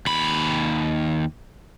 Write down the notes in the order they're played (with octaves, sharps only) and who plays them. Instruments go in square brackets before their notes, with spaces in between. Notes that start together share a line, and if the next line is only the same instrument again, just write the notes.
[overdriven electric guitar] D#2 B5